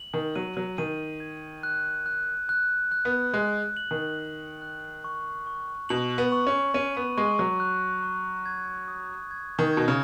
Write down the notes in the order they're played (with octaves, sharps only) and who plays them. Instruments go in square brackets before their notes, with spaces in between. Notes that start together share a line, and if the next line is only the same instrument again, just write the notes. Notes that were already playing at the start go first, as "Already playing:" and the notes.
Already playing: [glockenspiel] F#7
[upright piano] D#3
[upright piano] F#3 [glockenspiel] D#7
[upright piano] F#3
[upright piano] D#3 [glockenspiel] D#7
[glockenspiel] G#6
F#6
F#6
F#6
F#6
[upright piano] B3
[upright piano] G#3 [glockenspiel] F#6
[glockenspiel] F#7
[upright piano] D#3
[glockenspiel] F#6
F#6
C#6
C#6
[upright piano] B2 [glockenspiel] F#7
[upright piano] B3
[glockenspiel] C#6
[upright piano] C#4
[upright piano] C#4 [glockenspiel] D#7
[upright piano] B3
[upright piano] G#3 [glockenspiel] C#6
[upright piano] F#3
[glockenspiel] F#6
C#6
G#6
D#6
G#6
[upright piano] D#3
[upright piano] B2 [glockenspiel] G#6
[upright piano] C#3